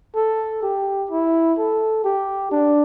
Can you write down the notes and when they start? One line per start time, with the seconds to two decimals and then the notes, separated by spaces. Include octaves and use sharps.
0.15 A4
0.63 G4
1.11 E4
1.58 A4
2.04 G4
2.51 D4